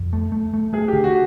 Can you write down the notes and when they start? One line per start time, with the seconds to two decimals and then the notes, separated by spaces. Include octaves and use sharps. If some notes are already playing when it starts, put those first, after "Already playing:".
Already playing: F2
0.13 A3
0.32 A3
0.54 A3
0.73 A3 G#4
0.88 D3 G4
1.04 F#4